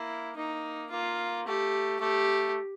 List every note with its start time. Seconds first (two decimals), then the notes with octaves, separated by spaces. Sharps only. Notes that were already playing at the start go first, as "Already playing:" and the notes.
Already playing: A#3 E4
0.36 A#3 D#4
0.91 A#3 F4
1.46 A3 G4
2.01 A3 G4